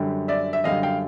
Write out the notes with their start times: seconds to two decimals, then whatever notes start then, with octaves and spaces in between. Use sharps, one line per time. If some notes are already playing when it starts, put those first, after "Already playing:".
Already playing: F#2 D3 G3
0.28 D5 E5
0.53 E5
0.64 F#2 D3 G3 D#5 F5
0.83 F5 G5